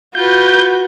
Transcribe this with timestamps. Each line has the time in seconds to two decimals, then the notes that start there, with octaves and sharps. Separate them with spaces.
0.15 F4 F#4 B4 G6